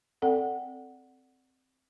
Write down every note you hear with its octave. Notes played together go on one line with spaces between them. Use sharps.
C4 A4 D5 F#5